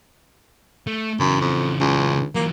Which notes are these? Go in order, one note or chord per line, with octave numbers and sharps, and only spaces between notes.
A3
F#2 C#3 E3
F2
C#2
E3 F#3 A#3